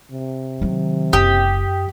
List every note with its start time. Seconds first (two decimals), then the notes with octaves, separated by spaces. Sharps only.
0.12 C3
0.61 D#3 F#3
1.13 F#1 F#2 G4 D#6